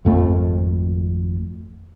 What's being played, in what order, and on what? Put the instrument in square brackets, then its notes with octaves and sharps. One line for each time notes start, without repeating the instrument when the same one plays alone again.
[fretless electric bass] G#1 F2 A3